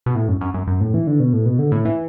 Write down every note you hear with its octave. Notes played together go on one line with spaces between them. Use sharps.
B2
A2
F#2
F#2
F#2
F#2
A2
E3
D3
B2
A2
B2
D3
A2
E3